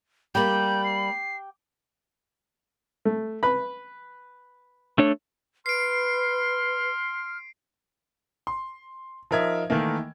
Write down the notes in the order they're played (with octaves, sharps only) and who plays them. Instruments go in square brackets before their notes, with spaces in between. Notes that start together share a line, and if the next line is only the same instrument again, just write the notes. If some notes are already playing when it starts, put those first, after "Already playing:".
[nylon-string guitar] G3 A#3 [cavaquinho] G4 [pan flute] B5 [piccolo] G6
[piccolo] C7
[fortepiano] A3
B4 B5
[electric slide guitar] A3 D4 C#5
[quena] B4 [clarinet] C6 [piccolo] F6 [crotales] C7 D7
[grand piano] C6
F3 D#4 A#4 E5 G#6
D#3 E3 A3 A#3